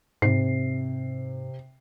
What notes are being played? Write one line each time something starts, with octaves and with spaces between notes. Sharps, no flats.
G#2 C3 C7